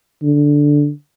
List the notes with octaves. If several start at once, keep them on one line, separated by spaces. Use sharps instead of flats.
D3